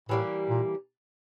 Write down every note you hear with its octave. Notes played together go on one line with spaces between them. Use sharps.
A2 E3 G3 A#3
A#2